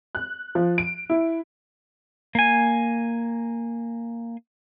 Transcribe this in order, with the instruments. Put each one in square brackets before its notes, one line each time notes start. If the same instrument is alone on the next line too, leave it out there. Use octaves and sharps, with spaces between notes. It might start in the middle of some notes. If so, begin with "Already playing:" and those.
[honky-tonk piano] F#6
F3
D7
E4
[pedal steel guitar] A#3 G#5